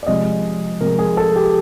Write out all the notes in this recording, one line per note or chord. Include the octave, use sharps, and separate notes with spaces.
D5
C3 F3 G#3 D#5
C3 F3 G#3 A#4
G#4
A4
G4